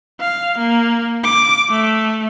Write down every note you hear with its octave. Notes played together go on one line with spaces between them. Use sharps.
F5
A#3
D6
A3